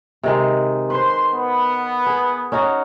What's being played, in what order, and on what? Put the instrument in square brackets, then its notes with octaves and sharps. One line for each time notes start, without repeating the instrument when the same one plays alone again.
[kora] C3 D#3 G#3
[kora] B4 C5 [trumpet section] C6
[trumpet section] B3
[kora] G#4
C#4 D#4 F#4